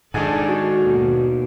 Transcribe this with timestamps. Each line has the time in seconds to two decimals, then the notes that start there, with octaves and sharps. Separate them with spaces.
0.14 G#2 D#3 D4 G#4 A4 G#5
0.49 F#4
0.82 D#2 B2